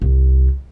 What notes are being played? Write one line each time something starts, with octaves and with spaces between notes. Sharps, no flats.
C2